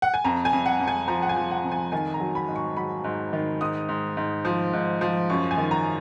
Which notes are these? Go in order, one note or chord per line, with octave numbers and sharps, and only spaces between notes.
F#5
G#5
F2 A#5
G#5
F2
F#5
F2
G#5
F3 A#5
F#5
G#5
F3
F#5
F2
G#5
D#3 G#5
A#5
F#3
B5
G#2
C#6
F#3 B5
G#2
D#3
G#2 D#6
G#2
G#2
F3
G#2
F3
F#2 C#6
G#5
D#3
A#5